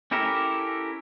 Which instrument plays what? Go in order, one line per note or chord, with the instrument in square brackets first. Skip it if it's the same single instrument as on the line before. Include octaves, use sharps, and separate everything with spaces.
[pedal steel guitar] C#4 E4 G4 A4 A#4